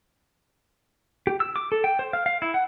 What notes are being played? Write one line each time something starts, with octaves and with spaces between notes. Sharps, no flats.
G4
E6
D6
A4
G5
C5
F5
F5
E4
F#5